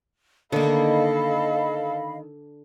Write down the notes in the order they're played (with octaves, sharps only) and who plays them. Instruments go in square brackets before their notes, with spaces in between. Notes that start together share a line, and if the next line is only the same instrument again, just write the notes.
[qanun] D3 [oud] D#3 A#3 [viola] A4 [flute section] D#5 F5 B5